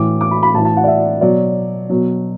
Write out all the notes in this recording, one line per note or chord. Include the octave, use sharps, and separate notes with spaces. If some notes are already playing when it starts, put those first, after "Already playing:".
Already playing: A2 E3 D6
D6
B5
B5
A2 E3 A5
A5
F#5
D5
E5
B2 F#3 D5
B2 F#3